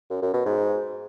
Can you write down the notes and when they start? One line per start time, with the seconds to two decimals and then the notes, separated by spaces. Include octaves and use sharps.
0.10 F#2
0.22 F#2
0.34 B2
0.46 G#2